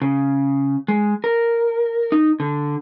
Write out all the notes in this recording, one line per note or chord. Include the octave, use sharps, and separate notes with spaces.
C#3
G#3
A#4
D#4
D3